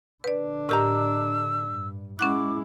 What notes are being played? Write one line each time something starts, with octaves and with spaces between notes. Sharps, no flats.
D3 D4 B4 D5
A2 G4 A#4 D#5 A#5 E6
G2
G#3 C#4 E4 F#5 D6 F#6